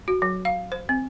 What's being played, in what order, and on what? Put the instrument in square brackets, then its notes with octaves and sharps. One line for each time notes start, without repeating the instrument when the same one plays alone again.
[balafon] F#4
F#3
F5
C5
C4